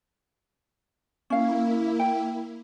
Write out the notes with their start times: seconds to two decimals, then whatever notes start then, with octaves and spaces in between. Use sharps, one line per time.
1.30 A#3 C#4 E4 F5
1.99 G5